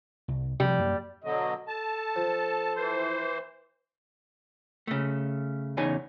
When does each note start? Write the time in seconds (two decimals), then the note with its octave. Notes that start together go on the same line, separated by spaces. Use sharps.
0.28 C2
0.60 C3 F3 G3
0.79 F#2 A#3
1.24 B2 D3 F#3 D#5
1.68 A4 A5
2.16 F3
2.76 E3 C5
4.87 C#3 A3
5.77 E2 C#3 D#4 G#5